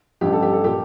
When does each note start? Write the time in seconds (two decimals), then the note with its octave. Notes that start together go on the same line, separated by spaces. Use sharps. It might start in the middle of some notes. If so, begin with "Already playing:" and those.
0.21 A1 G2 F3 G4
0.33 A4
0.42 G4
0.53 A4
0.64 A#2 F3 G4